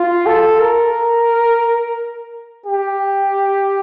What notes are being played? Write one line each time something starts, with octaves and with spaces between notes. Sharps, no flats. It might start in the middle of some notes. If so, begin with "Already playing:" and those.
Already playing: F4
A4
A#4
G4